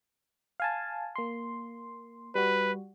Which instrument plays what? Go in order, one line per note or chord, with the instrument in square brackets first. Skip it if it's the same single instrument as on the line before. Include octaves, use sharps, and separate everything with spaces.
[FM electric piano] F5 G#5 A5
A#3 C6
[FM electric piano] G3 F#4 [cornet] B4